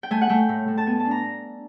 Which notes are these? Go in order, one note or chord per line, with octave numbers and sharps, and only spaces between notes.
G5
A3 G#5
F#5
A3 G5
A2
A2
A5
B3 G#5
A5
D4
A#5